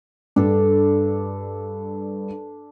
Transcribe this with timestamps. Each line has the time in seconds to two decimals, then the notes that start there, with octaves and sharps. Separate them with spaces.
0.36 G2 D4 A4